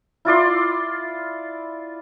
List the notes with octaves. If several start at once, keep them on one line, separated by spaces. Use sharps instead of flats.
E4 F4 D5 C6